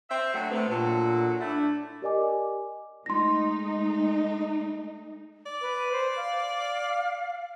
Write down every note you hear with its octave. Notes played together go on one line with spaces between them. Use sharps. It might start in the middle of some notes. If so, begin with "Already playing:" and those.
C4 E5
D3 F#3 A3
C3 A3 B3 C4
A#2 D3 F#3 A4
A3 D4 E4
G4 A#4 D5 D#5 G#5 D6
G#3 A3 D#4 C6 A#6
D5
B4
C5
F5